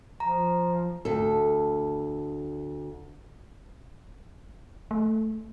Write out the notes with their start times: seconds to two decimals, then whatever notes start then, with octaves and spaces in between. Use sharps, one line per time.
0.20 F3 A#5
1.05 D2 A4
4.91 A3